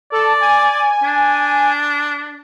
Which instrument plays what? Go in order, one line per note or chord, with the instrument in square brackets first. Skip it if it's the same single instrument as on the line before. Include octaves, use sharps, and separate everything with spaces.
[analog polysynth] A4 [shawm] D5
[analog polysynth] G#5
[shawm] D4